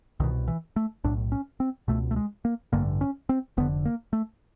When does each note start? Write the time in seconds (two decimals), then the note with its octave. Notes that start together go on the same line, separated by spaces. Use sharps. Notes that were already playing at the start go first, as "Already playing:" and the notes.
0.20 C2 B2 D#3
0.48 E3
0.76 A3
1.04 B1 A2 D4
1.32 C#4
1.60 C4
1.88 C#2 B2 A3
2.11 A3
2.16 G#3
2.45 A#3
2.73 A1 G2 D3 A#3
3.01 C#4
3.29 C4
3.57 F1 F2 D3 B3
3.85 A#3
4.13 A3